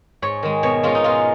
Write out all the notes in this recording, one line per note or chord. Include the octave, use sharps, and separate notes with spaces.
G#2 C#5
D#3 G#3
B2 C#5
G#3 C#4 F4
D#4
B2 F4